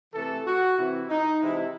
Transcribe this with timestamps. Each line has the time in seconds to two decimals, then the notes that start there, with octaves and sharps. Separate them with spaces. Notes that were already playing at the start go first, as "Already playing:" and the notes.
0.13 C3 E3 A3 A4
0.45 F#4
0.77 C3 E3 C4 E4
1.08 D#4
1.40 C3 E3 G#3 C4 E4